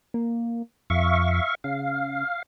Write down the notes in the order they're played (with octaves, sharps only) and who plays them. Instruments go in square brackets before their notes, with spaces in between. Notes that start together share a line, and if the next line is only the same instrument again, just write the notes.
[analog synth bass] A#3
[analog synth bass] F2 [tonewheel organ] E5 F5 C#6
[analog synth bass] C#3 [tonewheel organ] F5